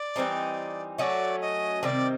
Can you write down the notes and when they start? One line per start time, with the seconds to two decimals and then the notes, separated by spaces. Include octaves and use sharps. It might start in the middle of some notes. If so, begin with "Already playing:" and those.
Already playing: D5
0.16 E3 G3 C4 D#4
0.98 F#3 A3 C#4 F#4 D5 D#5
1.41 D#5
1.82 C3 D#3 G3 C4 D5 D#5